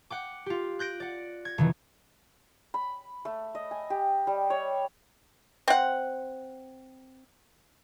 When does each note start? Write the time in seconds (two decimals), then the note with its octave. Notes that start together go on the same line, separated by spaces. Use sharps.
0.10 F#5 G5 D6
0.46 F4 G4
0.79 F#6 G6 A#6 D7
1.00 D5 F#5
1.45 G#6 A#6
1.58 F1 D#3 E3
2.74 B5
3.25 A3
3.55 D#5
3.71 G#5
3.90 G4
4.27 G3
4.50 C#5
5.68 C4 F#5